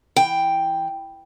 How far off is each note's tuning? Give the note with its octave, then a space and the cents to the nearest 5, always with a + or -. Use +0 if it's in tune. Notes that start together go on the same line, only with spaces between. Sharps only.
E3 +0 G5 +0